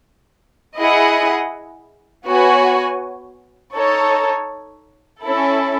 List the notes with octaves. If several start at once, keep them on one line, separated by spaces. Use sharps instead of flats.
E4 G#4 D#5 F#5
B3 F#4 C#5 G#5
D#4 A4 C#5
C#4 E4 A4